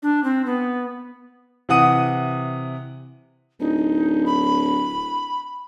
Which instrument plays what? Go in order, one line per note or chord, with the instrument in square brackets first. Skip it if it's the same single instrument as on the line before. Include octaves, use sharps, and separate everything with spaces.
[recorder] D4
C4
B3
[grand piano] C3 E3 F#5 D#6 D#7
[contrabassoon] D1 [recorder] D#4
[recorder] B5